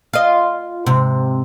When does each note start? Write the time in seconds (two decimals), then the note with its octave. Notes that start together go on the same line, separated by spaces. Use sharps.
0.13 F4 D#5
0.86 G#2 C3